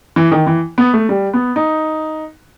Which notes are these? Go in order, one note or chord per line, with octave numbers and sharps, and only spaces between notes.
E3
D#3
E3
B3
A3
G3
B3
D#4